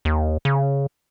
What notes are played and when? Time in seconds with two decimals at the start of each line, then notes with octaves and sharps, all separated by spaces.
0.05 D#2
0.45 C#3